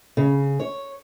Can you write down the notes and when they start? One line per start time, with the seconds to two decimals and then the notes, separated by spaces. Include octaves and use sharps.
0.17 C#3
0.60 C#5